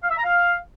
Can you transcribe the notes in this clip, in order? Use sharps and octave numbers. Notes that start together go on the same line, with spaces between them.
F5
E5
A#5
F5